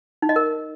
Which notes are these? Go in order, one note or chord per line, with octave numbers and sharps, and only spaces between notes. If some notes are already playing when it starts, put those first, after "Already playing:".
D#4
D#5
A#4